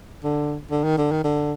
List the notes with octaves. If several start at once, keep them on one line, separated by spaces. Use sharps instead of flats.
D3
D3
D#3
D3
D#3
D3